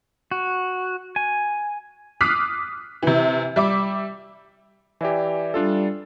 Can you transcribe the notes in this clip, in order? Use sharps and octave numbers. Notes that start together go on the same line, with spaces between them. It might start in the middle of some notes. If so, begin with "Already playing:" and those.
F#4
G#5
D6 D#6 F6 F#6 B6 C7
C3 E3
G3 E5 D6
E3 G4 D5 E5 G#5
G3 D4 F4 A4